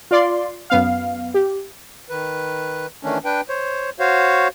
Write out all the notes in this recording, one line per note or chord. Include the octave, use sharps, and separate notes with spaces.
F4 D5 C6
F#2 B3 F5
G4
D#3 B4
D#3 E3 A3 C#4 D4
D4 B4 G5
C5 C#5
F#4 C5 C#5 F5